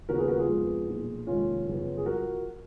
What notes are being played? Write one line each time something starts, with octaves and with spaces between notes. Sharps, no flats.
D#2 C#3 F3 B3 F#4 A#4
G#4 B4
F#4 A#4
F4 G#4
F2 F3 G#3 B3
B1 A#2 F3
F1 D#2 D#3 G#3 C#4 F4
F#2 C#3 F3 B3
G#4
F3 F#4 A#4